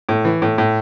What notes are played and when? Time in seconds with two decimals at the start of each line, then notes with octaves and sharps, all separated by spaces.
0.09 A2
0.25 E3
0.42 A2
0.58 A2